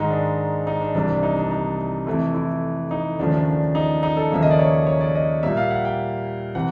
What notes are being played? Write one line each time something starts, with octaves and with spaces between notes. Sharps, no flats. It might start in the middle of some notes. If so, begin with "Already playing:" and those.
Already playing: G#2 D#3 G#3 D#4
D4
D#4
D4
C2 C3 E3 G3 D4
D4
D#4
D4
D#4
F2 C3 E3 A3 E4
E4
D#4
D#2 C#3 F3 A3 D4
D4
D4
D#4
D#4
A4
D#2 C#3 F3 A#3 E5
D#5
D5
C#5
C#5
D5
D#5
A#2 G3 A#3 E5
F5
F#5
G5
C3 E3 F#5